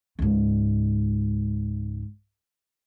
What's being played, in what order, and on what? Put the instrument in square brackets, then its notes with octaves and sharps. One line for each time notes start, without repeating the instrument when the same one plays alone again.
[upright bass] C#2 G#2